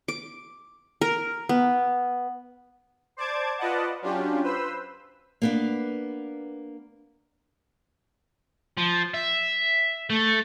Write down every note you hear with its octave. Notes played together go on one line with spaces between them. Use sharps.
D6
A#4
B3
C5 D5 A5 D6 G#6
F4 B4 D5 D#5 F#5 A5
F#3 C#4 D4 F4 G4
B4 C5 E6
A#3 B3 D4
F3
E5
A3